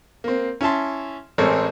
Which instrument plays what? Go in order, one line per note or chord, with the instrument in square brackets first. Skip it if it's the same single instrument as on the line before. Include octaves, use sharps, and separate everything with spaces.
[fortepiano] A#3 C4
C#4 E4 E5 A5 C6
A1 G#3 C4 A4 A#4 C#5